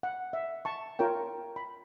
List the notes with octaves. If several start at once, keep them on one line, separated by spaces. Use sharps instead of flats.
F#5
E5
A5 C#6
F4 A#4 C#5 G5
B5